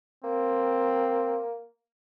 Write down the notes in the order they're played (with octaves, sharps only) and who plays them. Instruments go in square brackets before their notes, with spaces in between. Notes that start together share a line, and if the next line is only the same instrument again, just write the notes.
[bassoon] A#3 [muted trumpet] C4